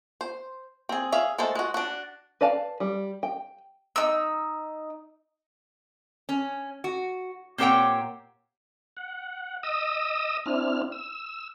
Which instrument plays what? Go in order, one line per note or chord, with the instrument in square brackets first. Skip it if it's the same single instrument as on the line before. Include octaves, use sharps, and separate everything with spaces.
[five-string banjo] C5
C4 G#4
G#4 E5 F5
G#3 A3 A4 C5
G#3 F#4
D4 F#4
B4 D5 F5 A5
G3
G5
[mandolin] D#4 E6
[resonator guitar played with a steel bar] C#4
F#4
A#2 C4 G4 C#5 F#5 G5
[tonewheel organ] F#5
D#5 D#6 E6
C4 D4 E4 F6
E6